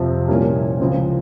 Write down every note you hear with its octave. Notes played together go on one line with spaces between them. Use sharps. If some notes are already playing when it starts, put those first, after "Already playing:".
Already playing: F2 C3 F3
C2 A#2 G3 A#3 C#4
C#2 C#3 F3 G#3 C4